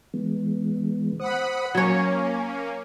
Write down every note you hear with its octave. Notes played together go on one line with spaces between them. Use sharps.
E3 G#3 B3
C5 F#5 B5 D#6
F#3 A#3 C#4 C#5 G#5